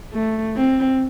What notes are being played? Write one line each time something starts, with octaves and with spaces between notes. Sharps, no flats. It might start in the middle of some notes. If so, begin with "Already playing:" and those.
A3
C4